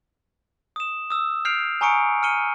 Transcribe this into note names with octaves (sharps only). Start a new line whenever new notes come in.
D#6 E7
D#6 E6
F6 G6 C7 D7 F7
G#5 A#5 C#6 D#6 C#7 D7
F6 C#7 D#7 G7